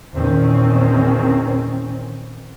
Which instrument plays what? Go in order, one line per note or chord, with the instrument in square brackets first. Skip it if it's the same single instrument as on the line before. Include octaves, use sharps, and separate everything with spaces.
[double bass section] E2 A#2 D#3 C4 C#4